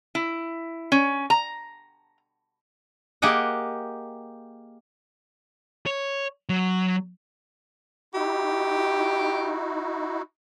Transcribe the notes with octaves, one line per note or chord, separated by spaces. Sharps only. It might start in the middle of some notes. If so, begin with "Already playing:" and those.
E4
C#4
A#5
A#3 G4 G#4 D#5 F#5
C#5
F#3
D#4 E4 F#4 G4